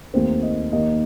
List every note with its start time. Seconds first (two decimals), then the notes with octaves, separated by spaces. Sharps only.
0.14 D#2 D#3 A3 C4
0.43 D#5
0.72 D#2 D#3 A#3 D#5